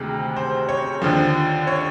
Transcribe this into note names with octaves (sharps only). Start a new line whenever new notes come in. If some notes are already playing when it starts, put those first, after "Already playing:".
Already playing: D2 C3 D#3 G#3
C5
C#5
D#2 D3 F3
C#5